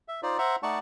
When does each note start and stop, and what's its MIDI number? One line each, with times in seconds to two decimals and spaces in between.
0.08 0.21 76
0.23 0.38 63
0.23 0.38 65
0.23 0.38 72
0.23 0.38 74
0.38 0.56 72
0.38 0.56 76
0.38 0.56 78
0.38 0.56 82
0.63 0.79 57
0.63 0.79 63
0.63 0.79 74
0.63 0.79 78
0.63 0.79 81
0.63 0.79 85